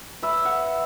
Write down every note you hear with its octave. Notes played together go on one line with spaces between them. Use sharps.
B4 E5
F#5